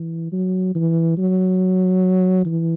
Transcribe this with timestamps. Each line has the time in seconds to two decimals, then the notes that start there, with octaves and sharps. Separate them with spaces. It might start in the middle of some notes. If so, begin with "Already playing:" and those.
Already playing: E3
0.32 F#3
0.75 E3
1.18 F#3
2.46 E3